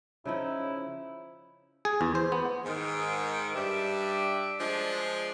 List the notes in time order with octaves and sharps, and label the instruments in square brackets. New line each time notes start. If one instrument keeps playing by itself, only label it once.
[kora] C#3 F3 D#4 [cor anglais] E4
[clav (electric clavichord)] G#4
E2
C5
B3
[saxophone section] G#2 D#3
G2 G3 D4 E5
F3 G#3 D4